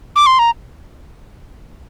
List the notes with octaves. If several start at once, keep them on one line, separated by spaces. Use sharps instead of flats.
D6
C6
A#5